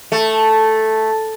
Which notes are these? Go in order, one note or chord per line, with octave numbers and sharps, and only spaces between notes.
A3